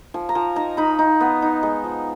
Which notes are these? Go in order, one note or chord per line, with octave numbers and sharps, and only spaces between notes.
F3 G#5
A#5
F3 G#5
D#4 A#5
D#4 B5
D#4
B3
D#4
G#3
F3